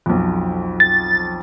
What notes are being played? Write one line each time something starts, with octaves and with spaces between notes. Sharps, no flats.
B1 F2
A6